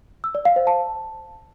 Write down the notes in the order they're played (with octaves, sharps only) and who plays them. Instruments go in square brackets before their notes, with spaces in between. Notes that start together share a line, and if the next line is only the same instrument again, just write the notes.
[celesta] E6
D5
F5
C5
A5